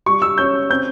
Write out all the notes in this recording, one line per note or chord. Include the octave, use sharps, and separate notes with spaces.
G3 C#6
E6
C#4 G6
C4 G6